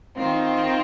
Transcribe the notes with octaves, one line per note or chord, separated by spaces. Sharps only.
D#3 C4 F4